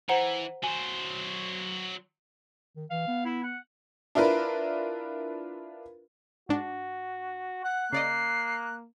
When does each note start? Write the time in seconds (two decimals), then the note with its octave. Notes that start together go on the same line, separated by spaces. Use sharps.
0.09 E3 C5 F#5 A#5
0.64 F#3 C5 G#5
2.76 D#3
2.90 E3 F5
3.07 B3
3.25 E4
3.44 F#5
4.15 D4 E4 F4 A#4 B4
6.49 G#2 D4 F#4
7.64 F#5 F#6
7.93 C#3 A#3 D5 D#5 C7